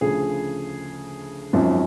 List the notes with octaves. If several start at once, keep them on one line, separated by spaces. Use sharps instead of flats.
D2 C#3 F3 G#4
G#1 F#2 F3